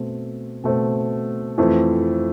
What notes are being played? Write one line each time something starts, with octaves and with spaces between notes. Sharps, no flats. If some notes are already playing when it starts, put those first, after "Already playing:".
Already playing: B2 A3 C4
B2 A3 C4
F2 E3 A3 C4